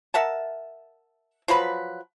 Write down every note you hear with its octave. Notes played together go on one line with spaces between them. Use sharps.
A#4 E5 F#5 A5
F3 F#3 B4 B5